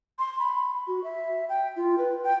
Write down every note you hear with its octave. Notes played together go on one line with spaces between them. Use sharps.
C6
B5
F#4
E5
G5
F4
B4
G5